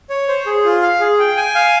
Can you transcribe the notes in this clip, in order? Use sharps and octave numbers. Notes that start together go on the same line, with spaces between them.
C#5
C5
G#4
F4
F5
G#4
G5
G#5
F5